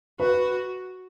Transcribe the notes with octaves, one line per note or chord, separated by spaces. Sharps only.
F#4 B4